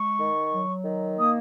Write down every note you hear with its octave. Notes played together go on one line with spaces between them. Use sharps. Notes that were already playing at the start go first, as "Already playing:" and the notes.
Already playing: G#3 C#6
D#3
F#3
D#3
A#3 D#6